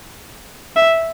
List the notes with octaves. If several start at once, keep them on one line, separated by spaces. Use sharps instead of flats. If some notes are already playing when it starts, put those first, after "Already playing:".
E5